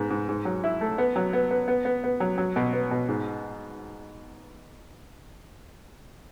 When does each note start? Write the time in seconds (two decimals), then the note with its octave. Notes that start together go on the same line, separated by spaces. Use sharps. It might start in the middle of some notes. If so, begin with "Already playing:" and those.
Already playing: G#2 B3
0.10 G#2
0.29 G#2
0.45 F#3
0.64 E4
0.81 A3
0.98 B3
1.16 F#3
1.33 B3
1.51 B3
1.68 B3
1.85 B3
2.04 B3
2.20 F#3
2.38 F#3
2.56 B2
2.73 B3
2.91 B2
3.08 G#2